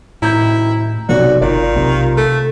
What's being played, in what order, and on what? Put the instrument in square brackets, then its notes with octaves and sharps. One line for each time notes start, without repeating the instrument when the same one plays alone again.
[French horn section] F#2 C3 D#3 [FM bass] A2 [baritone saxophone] E4 [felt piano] A#5 G6
[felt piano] B1 C3 [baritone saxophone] F#4 [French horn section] D5
[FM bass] G1 [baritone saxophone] D#3 [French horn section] F4 [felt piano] D5
[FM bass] B1 [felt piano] C3
[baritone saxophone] A3